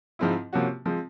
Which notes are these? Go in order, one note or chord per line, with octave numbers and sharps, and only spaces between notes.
G#2 F3 G#3 C4 E4
C3 F3 A#3 C#4 F#4
F3 G#3 C4